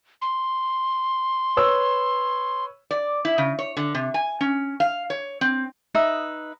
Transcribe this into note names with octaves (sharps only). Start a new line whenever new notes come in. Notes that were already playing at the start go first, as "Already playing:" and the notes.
C6
B4 C#5 E6
D5
E4
C#3
C#5
D3
C3
G#5
C#4
F5
C#5
C4
D#4 B4 E5 D#6